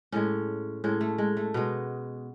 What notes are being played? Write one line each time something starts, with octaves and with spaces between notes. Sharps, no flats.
A2 G#3 C#4
A2 G#3 C#4
A3
G#3
A3
B2 G#3 B3